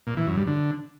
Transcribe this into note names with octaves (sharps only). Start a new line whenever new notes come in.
A#2
E3
F#2
G2
D3